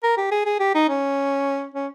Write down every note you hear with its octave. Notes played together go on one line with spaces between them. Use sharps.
A#4
G4
G#4
G#4
G4
D#4
C#4
C#4